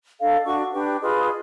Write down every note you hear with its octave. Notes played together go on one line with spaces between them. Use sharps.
D4 A4 D#5 F5
D4 F#4 C#6
D4 G4 B4 G5
F4 G#4 B4 D#5